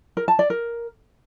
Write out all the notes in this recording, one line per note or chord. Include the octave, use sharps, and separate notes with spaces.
A#4
A5
D5
A#4